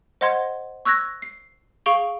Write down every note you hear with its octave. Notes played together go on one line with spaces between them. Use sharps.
C5 D#5 F#5 C6 G#6
C#6 E6 F#6 G#6 A#6
C7
G#4 F5 C#6 D7 F7 G7